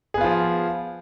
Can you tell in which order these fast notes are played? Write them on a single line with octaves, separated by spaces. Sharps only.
G#4 B3 F4 F3